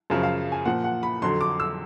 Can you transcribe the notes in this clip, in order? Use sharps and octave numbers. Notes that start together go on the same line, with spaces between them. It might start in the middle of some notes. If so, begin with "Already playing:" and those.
F#2 C#3 F3
F5
G#5
A#2 F3 F#5
F#5
B5
F2 D3 F#3 C6
D6
E6